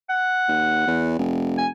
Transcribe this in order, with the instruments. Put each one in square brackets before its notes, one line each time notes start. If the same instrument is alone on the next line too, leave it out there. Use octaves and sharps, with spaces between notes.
[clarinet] F#5
[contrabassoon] D#2
E2
F1
[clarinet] G#5